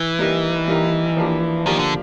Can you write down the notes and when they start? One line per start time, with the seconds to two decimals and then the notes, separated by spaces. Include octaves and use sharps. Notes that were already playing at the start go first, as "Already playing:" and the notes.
Already playing: E3
0.19 G3 A#3 D#4 G4 A#4
0.68 G3 A#3 D#4 G4 A#4
1.17 F3 A#3 D4 G4
1.66 D#3 F3 A#3 D4 G4
1.79 D3